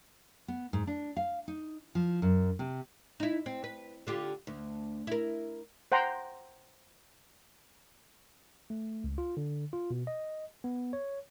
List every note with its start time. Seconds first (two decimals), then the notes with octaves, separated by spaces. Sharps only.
0.48 B3
0.73 G#2
0.87 D4
1.16 F5
1.48 D#4
1.95 F3
2.22 F#2
2.59 C3
3.20 D#4 E4
3.46 C4
3.64 B4
4.07 D3 F4 G4
4.47 D2
5.07 E4 A#4
5.92 C5 F#5 G5 A#5 C6
8.70 A3
9.04 C#2
9.18 F4
9.37 D3
9.73 F4
9.91 B2
10.07 D#5
10.64 B3
10.93 C#5